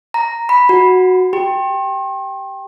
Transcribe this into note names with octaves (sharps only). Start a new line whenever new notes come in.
A#5
B5
F#4
G4